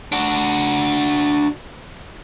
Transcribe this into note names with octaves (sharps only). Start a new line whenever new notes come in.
D4 F#4